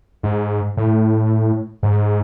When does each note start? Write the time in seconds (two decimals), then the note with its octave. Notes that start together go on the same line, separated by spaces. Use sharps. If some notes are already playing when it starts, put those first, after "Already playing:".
0.23 G#2
0.77 A2
1.83 G#2